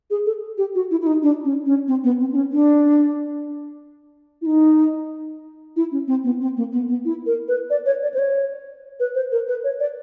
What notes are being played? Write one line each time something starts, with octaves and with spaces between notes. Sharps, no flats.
G#4
A4
G4
F#4
E4
E4
D#4
D4
C#4
C#4
C4
B3
C4
D4
C#4
D4
E4
D#4
E4
C#4
C4
B3
C4
A#3
B3
B3
E4
A#4
B4
D5
C#5
D5
C5
C#5
B4
C5
A#4
B4
C#5
D5